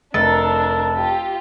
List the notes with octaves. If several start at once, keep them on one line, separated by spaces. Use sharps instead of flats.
F1 D4 A4 A#4
F4 G4